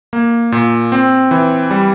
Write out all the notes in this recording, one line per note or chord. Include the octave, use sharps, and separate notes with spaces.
A#3
A#2
C4
E3
G3